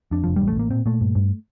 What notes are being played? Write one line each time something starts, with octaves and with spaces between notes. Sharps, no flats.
F2 D4
F1 F3
G3
A1
A3
A2 A#3
A#2 C4
A#2 A3
G2
G2